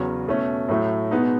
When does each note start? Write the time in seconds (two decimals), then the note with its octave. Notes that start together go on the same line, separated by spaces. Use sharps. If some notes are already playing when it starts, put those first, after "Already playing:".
Already playing: E2 C#3 F#3 C#4
0.27 B2 A3 C#4
0.69 A2 F#3 A3
1.11 B2 G#3 B3 D#4